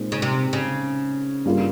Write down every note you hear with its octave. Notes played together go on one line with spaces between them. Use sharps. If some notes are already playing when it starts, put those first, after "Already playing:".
Already playing: A#2 G#3 C4 D#4
C#3
C3
C#3
G2 G3 A#3 F4 G#4